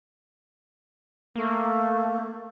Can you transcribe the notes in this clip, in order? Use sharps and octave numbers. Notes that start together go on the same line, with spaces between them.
A3 A#3